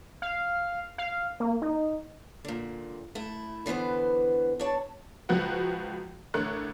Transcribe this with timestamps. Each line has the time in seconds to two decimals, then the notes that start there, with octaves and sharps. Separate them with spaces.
0.22 F5
0.98 F5
1.40 A#3
1.62 D#4
2.45 A#2 D3
3.15 A3 E4
3.66 D3 E3 B3 B4 C5
4.60 D4 C#5 A5
5.29 C#2 F3 F#4 B4 F#5
6.34 A1 D3 A3 A#4 C#5 F#6